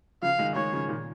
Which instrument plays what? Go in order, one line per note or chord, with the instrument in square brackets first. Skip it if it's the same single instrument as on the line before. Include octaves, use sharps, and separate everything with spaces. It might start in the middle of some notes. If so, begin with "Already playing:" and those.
[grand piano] C#3 F3 [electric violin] F5
[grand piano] D#3 G#3
[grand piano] D#3 G#3 [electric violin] C#5
[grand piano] C#3 F3
A#2 D#3